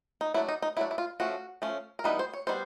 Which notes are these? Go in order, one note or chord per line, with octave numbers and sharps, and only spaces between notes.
D#4
F#3 A3 D4 E4
D#4
D#4
F#3 A3 D4 E4
E4
F4
F3 A3 C#4 F#4
F3 A3 C#4
A#4
E3 G3 B3 D#4 B4
C5
C#5
G3 B3 D#4 C5